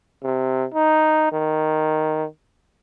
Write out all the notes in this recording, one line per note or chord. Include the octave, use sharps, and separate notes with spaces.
C3
D#4
D#3